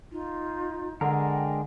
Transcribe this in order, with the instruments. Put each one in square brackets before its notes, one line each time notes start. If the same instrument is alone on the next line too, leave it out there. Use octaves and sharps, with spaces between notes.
[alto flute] D#4 [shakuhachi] F4
[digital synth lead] D3 [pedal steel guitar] G#3 D4 A#4 [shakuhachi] F#5
[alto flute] G5